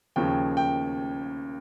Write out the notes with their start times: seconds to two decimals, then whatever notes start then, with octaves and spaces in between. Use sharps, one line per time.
0.16 D#2 C#3 F3 G5
0.57 G5